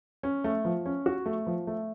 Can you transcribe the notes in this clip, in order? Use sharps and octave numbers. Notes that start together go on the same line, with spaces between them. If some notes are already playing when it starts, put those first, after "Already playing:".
C#4
A3
F3
C#4
F#4
A3
F3
A3